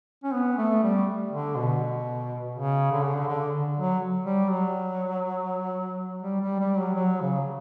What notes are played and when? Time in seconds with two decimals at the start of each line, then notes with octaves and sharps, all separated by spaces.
0.23 C#4
0.33 B3
0.58 A3
0.83 G3
1.31 D3
1.56 B2
2.55 C#3
2.92 D3
3.04 C#3
3.15 D3
3.28 D3
3.77 F#3
4.26 G3
4.51 F#3
6.22 G3
6.41 G3
6.59 G3
6.78 F#3
6.95 F#3
7.21 C#3